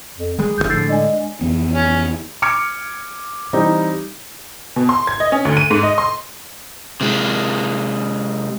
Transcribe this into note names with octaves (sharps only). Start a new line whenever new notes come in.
F2
D#3 G3 G#3 G#4
F#1 G2 E3 G6
A2 D3 F3 E6 A6 C7
G#3 D4 D5 G#5
F2 E3 B3
C#4
D6 F6 G#6 C#7
E3 G3 C4 D#4
B2
C6
G#6
D#5
C#4
D2
D#7
G#2
D#5
C6
C3 G#3